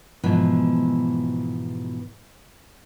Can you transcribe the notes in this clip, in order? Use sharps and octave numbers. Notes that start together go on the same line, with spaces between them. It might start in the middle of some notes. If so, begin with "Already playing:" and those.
G#2 B2 E3 F3